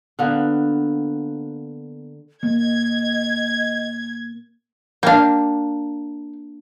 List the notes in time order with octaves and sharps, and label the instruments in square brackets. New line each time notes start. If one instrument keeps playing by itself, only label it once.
[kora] D3 A#3 B3 B4
[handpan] A#3 [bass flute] D#5 [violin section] G#6
[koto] A#3 D4 [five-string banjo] F5 G5